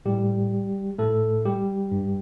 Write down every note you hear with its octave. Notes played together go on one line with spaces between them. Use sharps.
A2 G3 G4
A2 A3 A4
G3 G4
G2